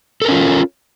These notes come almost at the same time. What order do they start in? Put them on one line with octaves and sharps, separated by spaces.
A4 A#4 C#4 F4